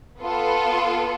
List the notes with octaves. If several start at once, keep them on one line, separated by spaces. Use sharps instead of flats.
B3 F4 A4